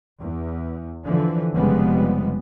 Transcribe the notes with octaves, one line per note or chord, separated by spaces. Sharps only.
E2
D3 E3 F3
F1 F2 C#3 G3 G#3 B3